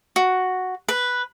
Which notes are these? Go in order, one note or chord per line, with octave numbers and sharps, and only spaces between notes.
F#4
B4